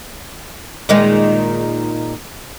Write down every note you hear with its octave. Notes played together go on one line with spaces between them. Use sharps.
A#2 D#3 G#3